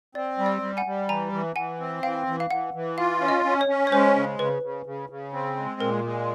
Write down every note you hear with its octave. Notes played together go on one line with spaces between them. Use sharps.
C4 D5
G3
D5
G3
F#5 G#5
G3
E3 G#5 A#5
E3
E3 F#5 G#5
C4
E3 F5 G5
E3
F5
E3 F#5
E3
F4 F5
C#4
D#5
C#4
C#5
C#4
C#5
G#3 C5
C#3
C#3 B4
C#3
C#3
C#3
C4
G#3
A#2 A#4
G#3